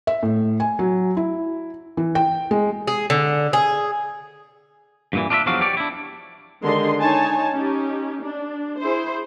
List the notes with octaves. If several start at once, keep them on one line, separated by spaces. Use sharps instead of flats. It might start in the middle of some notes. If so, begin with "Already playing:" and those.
E5
A2
G#5
F#3
E4
E3
G5
G#3
G#4
D3
G#4
G2 A#2 E3
D4 F4 D5 E5
E2 F3 F#3 D4 F#4 F5
G4 C#5 D5
D4 E4
D3 D#3 G#3 G4 D#5 C6
D#4 C#5 G#5 A5
C#4 D#4 G4
D4
E4 G#4 C5